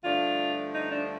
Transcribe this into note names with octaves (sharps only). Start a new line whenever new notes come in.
G2 D3 F3 A3 D4 F4
D#4
D4